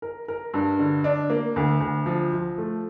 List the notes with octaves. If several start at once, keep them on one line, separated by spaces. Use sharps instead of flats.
A#4
A#4
G2
D3
D4
A#3
D2
D2
F3
F3
A3